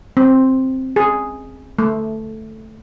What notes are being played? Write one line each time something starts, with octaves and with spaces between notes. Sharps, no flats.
C4
G#4
A3